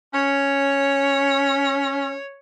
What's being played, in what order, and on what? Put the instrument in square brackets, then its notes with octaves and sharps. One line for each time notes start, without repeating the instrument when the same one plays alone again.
[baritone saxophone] C#4 [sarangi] C#5